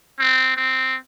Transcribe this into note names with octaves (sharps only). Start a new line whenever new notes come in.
C4
C4